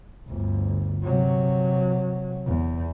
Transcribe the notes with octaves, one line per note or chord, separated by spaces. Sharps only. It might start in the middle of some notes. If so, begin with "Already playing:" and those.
G1 D2
C3 F#3
E2